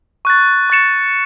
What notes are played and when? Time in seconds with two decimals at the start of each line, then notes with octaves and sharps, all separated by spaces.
0.25 C#6 F#6 A6
0.70 C#6 A6 C#7 E7